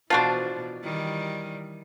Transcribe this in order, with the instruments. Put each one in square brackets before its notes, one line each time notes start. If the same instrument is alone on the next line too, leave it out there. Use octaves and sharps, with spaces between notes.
[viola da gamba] B2 E3 [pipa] F3 F#4 C5 [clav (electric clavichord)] D4 F4
[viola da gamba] D#3 E3 G3